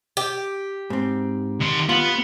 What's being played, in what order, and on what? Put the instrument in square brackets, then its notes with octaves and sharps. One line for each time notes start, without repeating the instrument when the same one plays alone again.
[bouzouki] G4
[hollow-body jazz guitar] G#2 C4
[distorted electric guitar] D#3 C6
[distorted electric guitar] B3 [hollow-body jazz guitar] F4